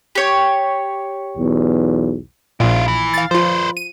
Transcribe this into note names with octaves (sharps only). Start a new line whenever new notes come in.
G4 C#5
B1 E2
A#1 A#2 E4 F4
E3
F5 A6
F3 F4 B4 C5
D#7